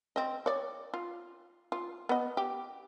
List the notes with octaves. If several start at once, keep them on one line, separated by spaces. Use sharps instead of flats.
C4 D#5
C#5 D5
F4
F4
B3 D#5
G4